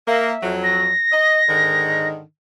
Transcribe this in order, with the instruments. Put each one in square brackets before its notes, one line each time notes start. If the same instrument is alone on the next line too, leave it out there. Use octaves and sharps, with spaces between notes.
[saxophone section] A#3 [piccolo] E5
[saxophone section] F2 F#3
[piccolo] A#6
[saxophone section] D#5
G#2 D3 D#3